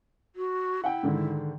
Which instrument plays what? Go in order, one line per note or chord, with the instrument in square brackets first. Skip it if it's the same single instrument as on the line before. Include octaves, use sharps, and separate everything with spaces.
[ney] F#4
[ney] E4 [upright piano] F#5 G5
[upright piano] G#2 D3 D#3